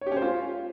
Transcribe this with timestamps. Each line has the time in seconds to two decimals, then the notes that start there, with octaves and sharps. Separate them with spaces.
0.01 C#5
0.07 G4
0.12 C#4
0.17 C5
0.22 F4